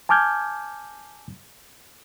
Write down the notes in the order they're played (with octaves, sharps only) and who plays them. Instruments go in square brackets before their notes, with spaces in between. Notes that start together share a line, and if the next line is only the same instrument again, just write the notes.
[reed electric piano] G#5 A5 D6 F6 G6 G#6